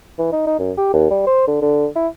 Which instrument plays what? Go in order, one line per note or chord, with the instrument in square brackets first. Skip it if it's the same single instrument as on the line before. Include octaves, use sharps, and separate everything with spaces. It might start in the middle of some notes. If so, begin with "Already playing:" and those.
[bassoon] E3
D#4
D#4
F#2
G4
D#2
G3
C5
D3
D3
E4